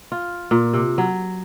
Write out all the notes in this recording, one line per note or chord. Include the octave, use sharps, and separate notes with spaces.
F4
A#2
C3
F#3